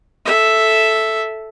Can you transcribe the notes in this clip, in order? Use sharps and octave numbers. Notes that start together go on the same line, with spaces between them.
A4 E5